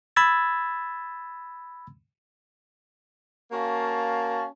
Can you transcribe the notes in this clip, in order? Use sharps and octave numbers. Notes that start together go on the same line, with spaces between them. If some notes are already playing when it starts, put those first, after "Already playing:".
B5 E6 G#6 A6
A#3 C#4 F#4 F5 A5